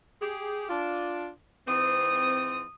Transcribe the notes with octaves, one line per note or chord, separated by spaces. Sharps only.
G4 G#4
D4 F4
G#2 E3 C4 D#6